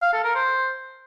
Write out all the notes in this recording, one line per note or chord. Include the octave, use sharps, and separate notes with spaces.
F5
A4
A#4
C5